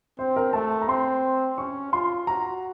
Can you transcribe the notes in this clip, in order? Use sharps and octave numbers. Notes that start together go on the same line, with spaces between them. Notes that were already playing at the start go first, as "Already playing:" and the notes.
C4 C5
A#4
A3 A5
A#5
C4 C6
C#4 C#6
F4 C6
F#4 A#5